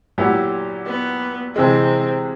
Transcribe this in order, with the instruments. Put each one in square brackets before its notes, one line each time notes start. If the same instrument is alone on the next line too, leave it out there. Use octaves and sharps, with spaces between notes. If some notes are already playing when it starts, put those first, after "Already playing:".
[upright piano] A#2 F#3 B3 E4 G4
[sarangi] B3
[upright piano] C3 E3 G#3 [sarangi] C4